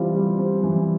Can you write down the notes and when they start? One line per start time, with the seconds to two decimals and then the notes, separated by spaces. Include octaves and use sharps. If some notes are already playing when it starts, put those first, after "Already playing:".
Already playing: E3 G3 C4 F4
0.14 G3
0.38 C4
0.63 E3